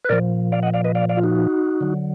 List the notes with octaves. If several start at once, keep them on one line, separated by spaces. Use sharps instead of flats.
B4
A#2 F3 A#4 D5
D5 F5
D#5 F#5
D5 F5
B4 D#5
D5 F5
D5 F5
F4
D#4 F#4
D3 F#3